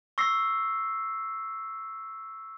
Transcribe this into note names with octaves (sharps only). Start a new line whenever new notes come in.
C#6 E6 A#6 C7